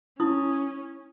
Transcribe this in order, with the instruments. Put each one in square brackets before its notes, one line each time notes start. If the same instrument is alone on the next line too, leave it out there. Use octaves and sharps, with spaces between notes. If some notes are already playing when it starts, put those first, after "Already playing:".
[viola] C#4 [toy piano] D#4 E4 D#6